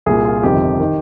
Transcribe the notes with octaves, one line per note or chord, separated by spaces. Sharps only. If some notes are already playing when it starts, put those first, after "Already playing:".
C2 A#2 G#4
F4
G1 F2 C3 D#3 G4
D#3